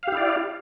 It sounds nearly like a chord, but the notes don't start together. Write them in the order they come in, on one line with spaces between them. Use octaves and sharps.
F5 G4 E4 D5